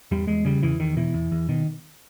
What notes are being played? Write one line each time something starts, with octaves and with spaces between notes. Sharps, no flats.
E2 G3
E2 G#3
C#3 G3
E2 E3
E2 D#3
B2 E3
E2
E2
B2 D#3